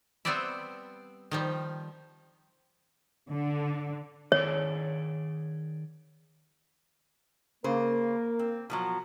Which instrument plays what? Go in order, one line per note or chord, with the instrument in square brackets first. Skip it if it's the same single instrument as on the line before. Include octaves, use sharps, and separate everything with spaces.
[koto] G3 B3 C4 C5 D5 E5
D#3 F3 G3
[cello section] D3
[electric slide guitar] D#3 G#4 D5 [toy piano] C#5
[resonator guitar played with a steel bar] C#3 C5 [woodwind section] A#3 [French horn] A#4
[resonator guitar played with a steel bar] C4
B2 F3 F#3